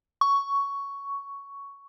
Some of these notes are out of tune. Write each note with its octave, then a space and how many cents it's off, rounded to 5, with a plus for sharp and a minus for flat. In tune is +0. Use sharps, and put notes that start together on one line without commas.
C#6 +10